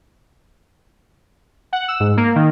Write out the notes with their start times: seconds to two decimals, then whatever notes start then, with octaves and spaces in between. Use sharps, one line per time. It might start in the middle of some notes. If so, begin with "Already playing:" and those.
1.73 F#5
1.88 E6
2.00 G#2
2.17 A#3
2.36 D#3